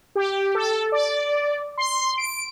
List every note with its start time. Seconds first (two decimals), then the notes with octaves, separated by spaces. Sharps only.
0.15 G4
0.55 A4
0.92 D5
1.77 C6
2.18 D7